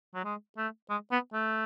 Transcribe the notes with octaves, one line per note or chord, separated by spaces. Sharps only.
F#3
G#3
A3
G#3
B3
A3